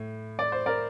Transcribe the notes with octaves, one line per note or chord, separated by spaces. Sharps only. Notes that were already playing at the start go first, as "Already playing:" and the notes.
Already playing: A2
D5
C5
A#4 D5